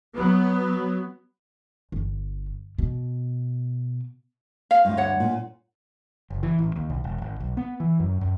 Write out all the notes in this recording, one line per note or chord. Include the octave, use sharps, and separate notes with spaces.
F#3 B3
G1
B2
F5
D2 G2
C#5 F#5
A#2
F#1
E3
A1
D#2
B1
E1
G#1
B1
B3
E3
F#2
F#2